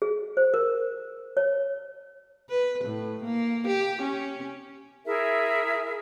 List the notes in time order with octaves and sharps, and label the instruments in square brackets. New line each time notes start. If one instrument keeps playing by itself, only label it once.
[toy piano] G#4
C5
A#4
C#5
[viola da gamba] B4
A2
A#3
G4
C#4
[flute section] E4 G#4 A#4 E5